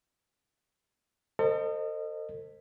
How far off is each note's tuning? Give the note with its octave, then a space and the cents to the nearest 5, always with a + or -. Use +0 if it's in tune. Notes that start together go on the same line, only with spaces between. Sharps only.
A4 +45 C5 +0 D#5 -20